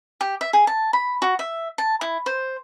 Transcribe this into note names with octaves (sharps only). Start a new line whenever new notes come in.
G4
E5
G#4
A5
B5
F#4
E5
A5
E4
C5